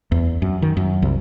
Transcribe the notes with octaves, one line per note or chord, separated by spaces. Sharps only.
E2
F#2
D#3
F#2
C2